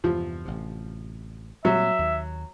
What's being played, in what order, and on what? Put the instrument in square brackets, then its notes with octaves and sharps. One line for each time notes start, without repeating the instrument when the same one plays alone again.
[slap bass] E2 G2 C3 [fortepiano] F3
[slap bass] A1 C3
[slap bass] A#2 G3 C4 [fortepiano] F#3 [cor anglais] E5
[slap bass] D#2